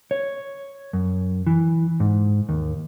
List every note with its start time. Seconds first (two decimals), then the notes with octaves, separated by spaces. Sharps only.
0.11 C#5
0.93 F#2
1.47 E3
2.00 G#2
2.49 D#2